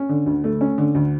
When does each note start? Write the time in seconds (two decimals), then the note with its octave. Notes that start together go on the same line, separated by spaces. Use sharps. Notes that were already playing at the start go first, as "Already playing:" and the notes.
Already playing: C#4
0.09 D3
0.26 D2
0.44 A3
0.61 C#4
0.78 D3
0.95 D2